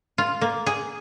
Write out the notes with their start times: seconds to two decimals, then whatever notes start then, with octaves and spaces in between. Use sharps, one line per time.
0.18 F4
0.41 A#3
0.66 G#4